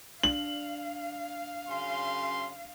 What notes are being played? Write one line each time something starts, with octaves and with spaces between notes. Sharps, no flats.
D4 F5 F#7
F#2 C#3 C6